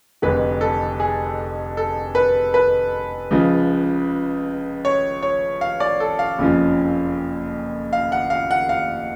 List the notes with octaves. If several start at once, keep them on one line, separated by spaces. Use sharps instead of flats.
F1 F2 D3 G#3 B4
A4
G#4
A4
B4
B4
C#2 C#3 F3
C#5
C#5
F5
D5
A4
F5
F#1 F2 C#3 F3
F5
F#5
F5
F#5
F5